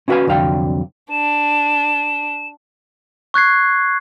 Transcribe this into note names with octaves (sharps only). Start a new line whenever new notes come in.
C#4 E4 F#4 B4 F5 G#5
C2 F2 D3 F#3 F5 G5
D4 E7
C#6 F#6 G#6 C7